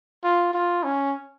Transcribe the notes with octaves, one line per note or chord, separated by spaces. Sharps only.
F4
F4
C#4